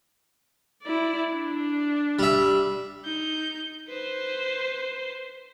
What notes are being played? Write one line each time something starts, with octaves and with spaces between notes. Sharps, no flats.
E4 D5
D4
G3 E5
D#4 G6
B4 C5